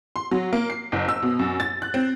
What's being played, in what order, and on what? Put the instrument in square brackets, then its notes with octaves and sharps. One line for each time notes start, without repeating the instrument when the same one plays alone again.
[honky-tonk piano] C6
F#3
A#3
C7
F#1
E6
B2
F#2
A6
F#6
C4